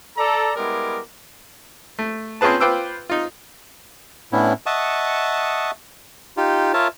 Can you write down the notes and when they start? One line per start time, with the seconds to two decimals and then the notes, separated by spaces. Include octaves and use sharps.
0.17 A4 D5 A#5
0.56 G3 G#3 B3 E4 A#4 D6
1.99 A3
2.41 C4 C#4 F4 G#4 B4 A5
2.61 F4 B4 C5 G5 D6 E6
3.10 D#4 F4
4.32 A2 B3 C#4 D4 E4
4.66 D#5 E5 F#5 A5 C#6 D#6
6.37 D#4 F4 G4
6.74 F4 A#4 C#5 E5 A5